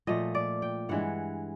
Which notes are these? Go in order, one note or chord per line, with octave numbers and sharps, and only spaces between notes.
A#2 F3 A3 D#5
D5
G5
G2 E3 G#3 F#5